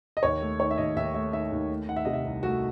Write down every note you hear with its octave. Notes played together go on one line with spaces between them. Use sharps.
D#5
D#2 C#5
A3
D#3 C#5
E5
D#2 D#5
D#2 E5
A3 E5
D#3 E5
D#2
A3
D#3 F#5
E5
C3 D#5
E5
C2
A3 F#4